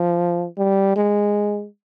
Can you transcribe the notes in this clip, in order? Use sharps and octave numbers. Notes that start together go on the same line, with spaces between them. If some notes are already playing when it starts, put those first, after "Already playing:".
Already playing: F3
G3
G#3